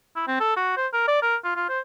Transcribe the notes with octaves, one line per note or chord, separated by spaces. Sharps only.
E4
C4
A4
F#4
C5
A#4
D5
A#4
F4
F4
C5